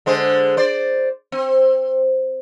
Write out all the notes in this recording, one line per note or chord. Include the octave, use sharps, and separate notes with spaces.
D3 G#3 C5
C5 D5
C4